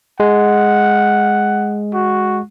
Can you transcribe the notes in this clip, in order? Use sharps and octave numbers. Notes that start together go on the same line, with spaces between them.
G#3 F#5
F#4